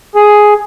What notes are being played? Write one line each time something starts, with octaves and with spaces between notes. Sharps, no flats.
G#4